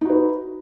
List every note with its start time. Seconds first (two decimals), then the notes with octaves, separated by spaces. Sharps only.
0.01 D#4
0.05 F#4
0.10 B4